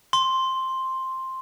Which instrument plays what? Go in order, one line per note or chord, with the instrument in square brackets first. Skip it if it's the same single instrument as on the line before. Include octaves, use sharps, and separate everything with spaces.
[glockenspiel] C6